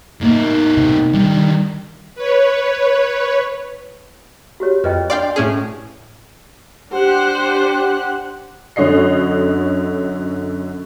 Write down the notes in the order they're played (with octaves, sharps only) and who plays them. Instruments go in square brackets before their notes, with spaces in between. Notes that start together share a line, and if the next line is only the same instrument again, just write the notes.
[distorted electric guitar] A2 B3 [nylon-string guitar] A#3 [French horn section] D#4
[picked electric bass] C3
[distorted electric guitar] D3 D#3 [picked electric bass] G3
[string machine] B4 C#5
[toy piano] F#4 G4 C#5
[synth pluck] F2 [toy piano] B4 D#5 G5
[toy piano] D4 C6 [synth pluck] D5 F5 G5
[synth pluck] A2 C#4 G#4
[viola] D4 C5 [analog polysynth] G4 F#6 [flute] F#5
[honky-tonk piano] F#2 D3 C#5 D#5 C7